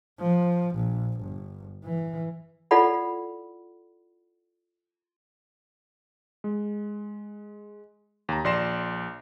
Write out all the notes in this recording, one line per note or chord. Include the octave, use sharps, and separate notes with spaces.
F3
A#1
G1
E3
E4 F4 A4 D5 F#5 B5
G#3
D#2 A#5
A#1 D5 C6 A#6 C7 E7